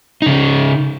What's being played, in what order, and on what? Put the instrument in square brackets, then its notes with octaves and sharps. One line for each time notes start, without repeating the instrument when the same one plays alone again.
[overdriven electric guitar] C#3 D#4